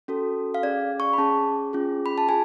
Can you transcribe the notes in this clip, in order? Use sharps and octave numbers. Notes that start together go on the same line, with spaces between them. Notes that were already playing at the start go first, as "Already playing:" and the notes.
C#4 F#4 A4
F5
C#4 G#4 D5
C#6
B5
C#4 G#4 A5
C#4 F4 G#4
B5
A5
F4 G#4 G#5